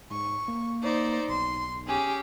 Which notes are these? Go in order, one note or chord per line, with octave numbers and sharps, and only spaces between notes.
G#2 C#6
A#3
D#4 C5 D5
B1 C6
C#4 G4 G#4